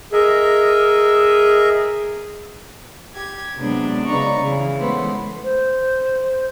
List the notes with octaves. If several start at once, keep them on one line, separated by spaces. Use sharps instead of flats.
G#4 A#4 D#5 E5
G4 G#6
C3 F#3 G#3 B3 D4
C#3 D#4 B4 D5 A#5 C#6
C#3 E3
E3 G#3 A3 B3 C5
C5